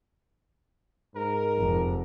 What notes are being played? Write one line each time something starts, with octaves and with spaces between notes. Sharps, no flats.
G#2 A#4
F1